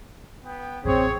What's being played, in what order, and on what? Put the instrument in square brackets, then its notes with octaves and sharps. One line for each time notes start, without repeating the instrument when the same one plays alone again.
[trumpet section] B3 G5
[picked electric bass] D1 A1 F#2 [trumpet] C4 [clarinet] G#4 [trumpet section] C#5